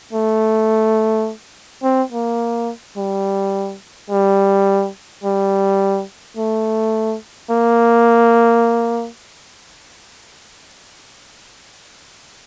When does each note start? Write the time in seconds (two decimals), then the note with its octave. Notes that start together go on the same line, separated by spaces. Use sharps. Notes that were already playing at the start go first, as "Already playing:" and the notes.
0.13 A3
1.83 C4
2.12 A#3
2.97 G3
4.10 G3
5.24 G3
6.37 A3
7.50 A#3